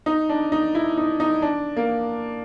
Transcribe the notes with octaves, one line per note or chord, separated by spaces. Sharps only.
D#4
D4
D#4
E4
D#4
D#4
D4
A#3